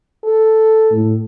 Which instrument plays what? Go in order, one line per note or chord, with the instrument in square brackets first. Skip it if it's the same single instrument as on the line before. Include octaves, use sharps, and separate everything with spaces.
[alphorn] A4
[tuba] A2